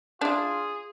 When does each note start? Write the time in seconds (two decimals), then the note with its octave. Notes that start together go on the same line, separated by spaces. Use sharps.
0.21 D4 E4 F4 G#4